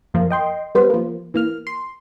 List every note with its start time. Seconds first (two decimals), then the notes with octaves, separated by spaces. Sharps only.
0.14 F#2 F3 A#3
0.30 D#5 G5 C6
0.75 G3 B3 B4 C5
0.90 F3 A#3
1.34 E3 A#3 F6
1.67 C6